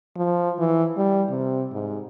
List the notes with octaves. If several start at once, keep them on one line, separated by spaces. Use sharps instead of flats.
F3
E3
G3
C3
G#2